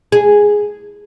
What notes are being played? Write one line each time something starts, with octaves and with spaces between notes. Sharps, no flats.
G#4